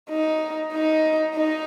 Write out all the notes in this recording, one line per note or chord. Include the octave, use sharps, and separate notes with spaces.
D#4
D#4
D#4